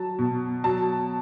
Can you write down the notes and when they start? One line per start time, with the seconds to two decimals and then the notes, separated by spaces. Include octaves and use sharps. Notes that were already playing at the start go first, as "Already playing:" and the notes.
Already playing: F#3 A5
0.19 B2
0.64 F#3 A5